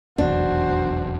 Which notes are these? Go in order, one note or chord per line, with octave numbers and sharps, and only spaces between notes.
F1 B1 E2 D4 F#4 C5